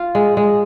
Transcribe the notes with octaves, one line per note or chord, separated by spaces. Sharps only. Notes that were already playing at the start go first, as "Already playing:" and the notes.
Already playing: F4
G#3
G#3